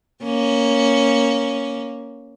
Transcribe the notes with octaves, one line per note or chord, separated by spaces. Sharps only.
A#3 C#4